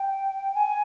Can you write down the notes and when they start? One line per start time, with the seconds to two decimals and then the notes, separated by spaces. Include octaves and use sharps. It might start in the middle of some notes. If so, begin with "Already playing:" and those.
Already playing: G5
0.55 G#5